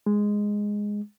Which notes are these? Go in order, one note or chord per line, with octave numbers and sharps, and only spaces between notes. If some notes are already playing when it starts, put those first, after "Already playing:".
G#3